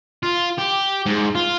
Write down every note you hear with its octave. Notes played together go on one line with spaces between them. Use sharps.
F4
G4
G#2
F4